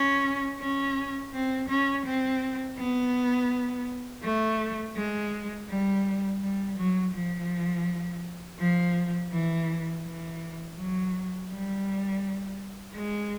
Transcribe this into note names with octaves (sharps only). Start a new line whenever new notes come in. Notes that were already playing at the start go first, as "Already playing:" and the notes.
Already playing: C#4
C#4
C4
C#4
C4
B3
A3
G#3
G3
G3
F#3
F3
F3
E3
E3
F#3
G3
G#3